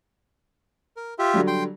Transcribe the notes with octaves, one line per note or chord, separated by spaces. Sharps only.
A#4
F4 G4 E5
D3 F#3 G3
G5 C6